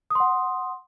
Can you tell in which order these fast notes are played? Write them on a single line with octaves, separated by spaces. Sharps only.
D#6 C6 F#5